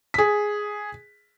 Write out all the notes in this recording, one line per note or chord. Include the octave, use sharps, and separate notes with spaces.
G#4 B6